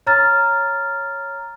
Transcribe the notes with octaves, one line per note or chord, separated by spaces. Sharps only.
C#5 A#5 F6 A6